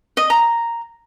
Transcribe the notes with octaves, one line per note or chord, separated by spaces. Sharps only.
D#5
A#5